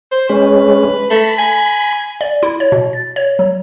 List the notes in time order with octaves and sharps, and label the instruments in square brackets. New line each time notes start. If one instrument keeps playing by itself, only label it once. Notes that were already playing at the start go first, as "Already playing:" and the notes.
[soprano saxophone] C5
[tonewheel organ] G#3 C#4 [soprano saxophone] B4
[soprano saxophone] A3 [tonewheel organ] B5
[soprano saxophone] G#5
[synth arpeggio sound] D5
E4
C#5
B2
A6
C#5
F#3